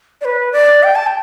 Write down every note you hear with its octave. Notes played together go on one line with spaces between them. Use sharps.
D5
B4
D5
G5
A5
G5